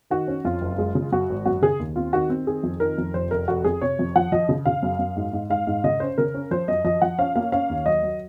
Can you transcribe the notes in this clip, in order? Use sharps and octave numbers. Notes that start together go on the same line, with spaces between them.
D#3 F#4
C#4
F2 F4
F#1
G#3
C#3
F#2 F#4
G#1
F#2 F#4
C#3 G#4
D#2
C4 F4
D#3 F#4
C4
D#3 G#4
F2
D#3 A#4
F2
F1 C5
F1 A#4
F1 F#4
F2 G#4
C3 C#5
F2
F3 F#5
F3 D#5
C#3
C#3 F5
F#2
F#2
G#2
G#2
G#2 F5
G#2
C#3 D#5
C#4 C5
C#3 A#4
C#4
F3 C5
F#2 D#5
F3 D#5
F3 F#5
C#4 F5
A#3 F5
C#4 F5
D#2
F#3 D#5
F#3